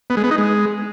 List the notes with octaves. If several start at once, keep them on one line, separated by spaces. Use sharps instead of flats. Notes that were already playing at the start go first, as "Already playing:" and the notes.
B3
G#3
B3
D#4
G#3